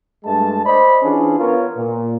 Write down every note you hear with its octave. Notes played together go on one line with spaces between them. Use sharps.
G2 G#3 A3 A5
C5 D5 D#5 B5
E3 C#4 D4 F4 G#4
B3 F4 A#4 C#5
A#2